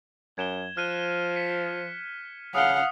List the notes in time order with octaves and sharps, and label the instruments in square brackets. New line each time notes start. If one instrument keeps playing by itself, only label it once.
[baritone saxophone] F#2 [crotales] G#6 E7 G7
[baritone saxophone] F3 [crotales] F6 F#6 D#7
[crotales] B6 C#7 D#7
[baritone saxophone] C#3 [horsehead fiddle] F5 F#5 [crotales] D#6 G7